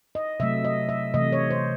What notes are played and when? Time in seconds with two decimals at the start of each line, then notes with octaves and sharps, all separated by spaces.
0.15 D#5
0.40 C3 F#3 A3 E5
0.65 D#5
0.89 E5
1.14 C3 E3 A3 D#5
1.32 C#5
1.51 C5